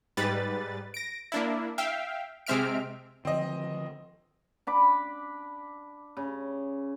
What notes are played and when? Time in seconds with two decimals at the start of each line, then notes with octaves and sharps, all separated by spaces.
0.17 G#2 G3 B4 A6
0.94 A#6 D7
1.32 A#3 D4 E4
1.78 E5 F5 G5
2.47 C3 G#3 C4 E5 F6 D7
3.25 D3 D#3 F3 C4 D#5
4.67 D4 B5 D6
6.17 C#3